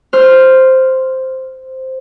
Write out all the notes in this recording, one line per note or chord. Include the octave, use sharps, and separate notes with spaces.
C5 F6